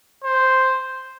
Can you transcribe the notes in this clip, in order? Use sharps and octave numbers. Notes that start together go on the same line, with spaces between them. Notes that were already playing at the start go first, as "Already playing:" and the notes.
C5